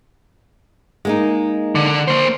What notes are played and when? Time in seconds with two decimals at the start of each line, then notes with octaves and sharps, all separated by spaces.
1.05 G#3 A#3 D#4
1.75 D3
2.08 A#3 C5